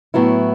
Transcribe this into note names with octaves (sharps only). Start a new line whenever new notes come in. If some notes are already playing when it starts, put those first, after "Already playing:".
A2 F#3 B3 E4